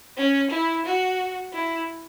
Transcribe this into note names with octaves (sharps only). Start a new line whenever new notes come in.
C#4
E4
F#4
E4